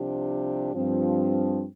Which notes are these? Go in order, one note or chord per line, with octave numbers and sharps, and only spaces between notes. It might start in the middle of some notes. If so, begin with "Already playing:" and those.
Already playing: C2 C3 F3 D4 G4
G2 F3 C4